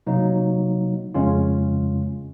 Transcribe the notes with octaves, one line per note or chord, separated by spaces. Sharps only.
C3 F#3 A#3 D#4
F2 C#3 G#3 C#4 F4